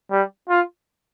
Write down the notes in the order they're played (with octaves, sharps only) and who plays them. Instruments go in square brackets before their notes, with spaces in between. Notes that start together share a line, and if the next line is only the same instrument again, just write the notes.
[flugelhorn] G3
F4